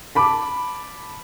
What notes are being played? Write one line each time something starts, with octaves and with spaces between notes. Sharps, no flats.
A5 B5 D6